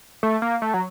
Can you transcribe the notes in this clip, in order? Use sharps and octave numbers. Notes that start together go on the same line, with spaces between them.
A3
A#3
A3
F#3